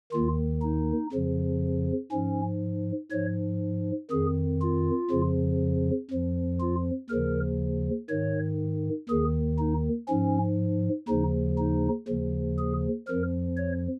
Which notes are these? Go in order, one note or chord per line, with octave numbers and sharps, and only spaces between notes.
D#2 D#3 F4
D#4
F2 C#3 F3
G#2 F3 C#4
G#2 F3 C#5
F2 D#3 G#4
F4
F2 C#3 F3
F2 F3
F4
D#2 C#3 F3 A#4
G#2 D#3 C#5
D#2 D#3 G#4
D#4
G#2 F3 C#4
D#2 C#3 F3 D#4
D#4
D#2 C#3 F3
G#4
F2 F3 A#4
C#5